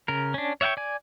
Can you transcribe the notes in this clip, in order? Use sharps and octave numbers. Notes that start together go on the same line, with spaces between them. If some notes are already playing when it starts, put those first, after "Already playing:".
C#3 A#4
C#4 D4
C#5 E5 F#5 G5 C#6
D5 G#5